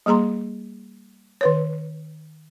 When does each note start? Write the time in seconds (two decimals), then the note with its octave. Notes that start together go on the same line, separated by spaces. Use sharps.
0.06 G3 A#3 G#4 A#5 C6
1.41 D#3 B4 C#5